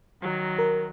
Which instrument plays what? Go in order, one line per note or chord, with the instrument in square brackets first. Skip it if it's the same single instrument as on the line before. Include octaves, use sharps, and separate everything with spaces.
[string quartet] D#3 F#3
[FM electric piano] A#4